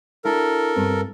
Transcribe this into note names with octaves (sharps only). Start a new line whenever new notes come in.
D4 E4 F#4 A4 A#4
G2 C4